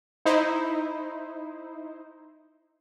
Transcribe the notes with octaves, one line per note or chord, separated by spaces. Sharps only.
D#4 E4 C5